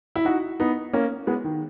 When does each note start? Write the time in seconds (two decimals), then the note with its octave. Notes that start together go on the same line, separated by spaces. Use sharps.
0.16 E4
0.25 D#4 F#4
0.60 B3 D#4
0.93 A#3 C#4
1.27 G#3 B3
1.44 D#3